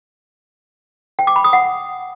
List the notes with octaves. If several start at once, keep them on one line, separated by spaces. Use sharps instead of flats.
G5
D6
B5
D#6
F#5